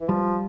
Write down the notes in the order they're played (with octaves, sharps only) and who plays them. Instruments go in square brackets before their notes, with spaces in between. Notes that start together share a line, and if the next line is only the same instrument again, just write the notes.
[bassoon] E3
[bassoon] F3 [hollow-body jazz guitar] G3